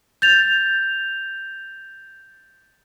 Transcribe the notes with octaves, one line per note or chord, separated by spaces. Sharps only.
G6 A6 F7